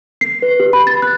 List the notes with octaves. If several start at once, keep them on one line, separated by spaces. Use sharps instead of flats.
C7
B4
G4
B5
A6
F#6